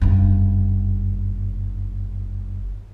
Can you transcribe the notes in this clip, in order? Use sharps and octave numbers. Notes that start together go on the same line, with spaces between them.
F#1 G2